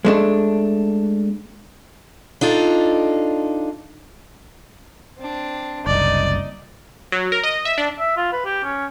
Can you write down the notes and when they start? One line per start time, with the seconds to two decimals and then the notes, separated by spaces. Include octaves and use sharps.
0.05 G#3 A3 D4
2.41 D4 D#4 F4 A4
5.18 C4 D4
5.87 F#1 C2 D#4 D5 D#5
7.12 F#3
7.32 A#4
7.43 D#5
7.65 E5
7.78 D4
7.99 E5
8.17 F4
8.33 B4
8.45 G4
8.64 C#4